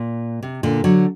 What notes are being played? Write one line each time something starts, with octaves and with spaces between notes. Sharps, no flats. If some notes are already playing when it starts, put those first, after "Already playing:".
Already playing: A#2
C3
A#2 D3
D3 F#3